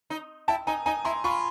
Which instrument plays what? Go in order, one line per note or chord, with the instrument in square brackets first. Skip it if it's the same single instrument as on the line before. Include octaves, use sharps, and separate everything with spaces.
[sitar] D#4
[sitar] E4 [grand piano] G5 A5
[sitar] D#4 [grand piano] G#5 A#5
[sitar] D#4 [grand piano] G#5 A#5
[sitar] E4 [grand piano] A#5 C6
[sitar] F4 [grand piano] B5 C#6